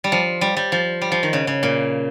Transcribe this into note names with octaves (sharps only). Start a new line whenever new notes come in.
G3
F3
G3
G3
F3
G3
F3
D#3
C#3
C#3
A#2